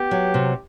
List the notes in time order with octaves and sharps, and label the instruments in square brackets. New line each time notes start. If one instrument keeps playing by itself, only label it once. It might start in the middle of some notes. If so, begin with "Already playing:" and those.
Already playing: [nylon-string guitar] B3 [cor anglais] G4
[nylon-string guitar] F#3
C3